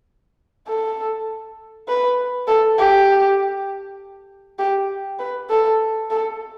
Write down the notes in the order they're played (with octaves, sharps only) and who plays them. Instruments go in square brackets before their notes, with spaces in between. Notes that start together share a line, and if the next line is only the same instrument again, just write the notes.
[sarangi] A4
B4
A4
G4
G4
B4
A4
A4